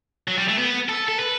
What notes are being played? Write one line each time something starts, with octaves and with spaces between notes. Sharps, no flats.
F#3
G3
A3
B3
A4
A4
B4